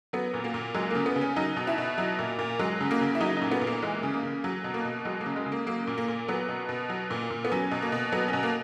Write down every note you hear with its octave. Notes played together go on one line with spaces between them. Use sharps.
F#3 B3
A#2
A#3
A#2
F#3 G#3
C#3 A#3
B3
C#3
C#4
F#3 D#4
B2
E4
B2
F#3
A#2
A#2
F#3 G#3
C#3
A#3
C#3
E4
F#3 D#4
A#2 D#4
B3
A#2
A#3
E3 G#3
C#3
A#3
C#3
F#3
B2
A#3
B2
F#3 G#3
A#3
C#3
G#3
C#3
A#3
F#3 A#3
A#2
A#3
A#2
F#3 B3
B2
B2
F#3
A#2
A#2
B3
F#3 C#4
B2
A#3
B2
F#3 B3
C#4
B2
A#3